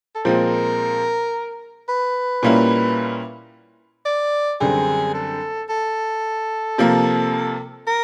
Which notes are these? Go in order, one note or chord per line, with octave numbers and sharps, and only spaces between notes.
A4
A#2 F3 G#3 C4 A#4
B4
A#2 G3 A#3 C#4 E4
D5
F#2 D3 G3 C4 G#4
A4
A4
C3 F3 A#3
A#4